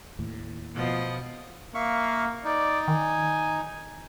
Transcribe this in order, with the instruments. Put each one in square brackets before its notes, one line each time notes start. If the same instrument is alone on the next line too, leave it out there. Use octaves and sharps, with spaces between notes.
[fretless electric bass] D#2 A2
[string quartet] B2 F3 D#5
[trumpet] A#3 [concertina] E5 F5 C#6
[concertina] D#4 [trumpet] D5
[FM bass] D#3 [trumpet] G#5